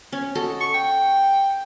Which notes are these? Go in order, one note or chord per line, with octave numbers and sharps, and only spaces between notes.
C#4
F#4 A4 D#5
C#6
G5